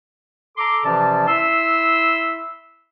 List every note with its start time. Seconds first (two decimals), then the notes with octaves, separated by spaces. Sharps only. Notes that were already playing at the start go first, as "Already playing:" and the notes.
0.57 A4 A#5 C6 D6
0.85 C3 E3 F3 C#4 D5 A5
1.28 E4 E5 C6 E6